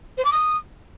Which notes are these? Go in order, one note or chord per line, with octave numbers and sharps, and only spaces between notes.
C5
D6
D#6